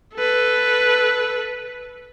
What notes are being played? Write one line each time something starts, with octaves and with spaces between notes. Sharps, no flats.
A4 B4